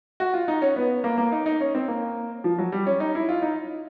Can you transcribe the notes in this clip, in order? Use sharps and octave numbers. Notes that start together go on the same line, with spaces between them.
F#4
F4
D#4
C#4
B3
A#3
A#3
D#4
D#4
C#4
C4
A#3
F3
F#3
G3
C#4
D#4
E4
F4
D#4